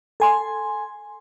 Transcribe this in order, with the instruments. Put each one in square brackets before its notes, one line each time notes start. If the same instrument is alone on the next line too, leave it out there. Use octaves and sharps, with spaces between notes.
[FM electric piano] A4 G#5 C6